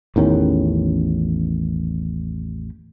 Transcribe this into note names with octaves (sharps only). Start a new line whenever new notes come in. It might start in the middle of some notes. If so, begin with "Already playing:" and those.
A1 E2 D#3 C#4